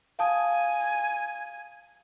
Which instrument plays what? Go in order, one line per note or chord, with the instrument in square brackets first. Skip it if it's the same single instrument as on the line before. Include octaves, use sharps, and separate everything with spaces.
[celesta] F5 A5 D#6 [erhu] G#5